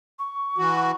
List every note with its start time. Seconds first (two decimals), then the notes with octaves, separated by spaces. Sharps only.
0.19 C#6
0.58 E3 F#4